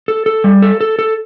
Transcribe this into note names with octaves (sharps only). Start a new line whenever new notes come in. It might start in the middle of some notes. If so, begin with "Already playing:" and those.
A4
A4
G3
A4
A4
A4